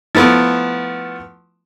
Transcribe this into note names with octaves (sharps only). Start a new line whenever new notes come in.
F3 A3 B3 E4